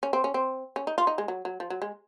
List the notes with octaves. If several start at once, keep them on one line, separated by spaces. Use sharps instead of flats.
C#4
C4
C#4
C4
C#4
D#4
F4
D#4
G#3
F#3
F#3
F3
F#3
G#3